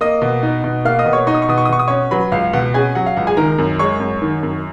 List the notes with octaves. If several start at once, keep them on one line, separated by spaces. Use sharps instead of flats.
A#3 D#5 D#6
B2
D#4
B2
A#3 F5 F6
D#5 D#6
B2
C#5 C#6
D#4 C#6
D#6
C#6
B2 D#6
C#6
D#6
B2 C#6
D#6
C#4 C#5 C#6
F#3 B4 B5
C#2 F5
B2 F#5
C#4 G#4 G#5
F#3 F#5
F5
C#2 F#5
G#4 G#5
D#3 A#4 A#5
F#2
G#3 C#5 C#6
F#2
D#3
F#2